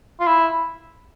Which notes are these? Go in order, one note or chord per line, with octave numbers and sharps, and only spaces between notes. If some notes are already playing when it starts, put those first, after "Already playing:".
F4
E4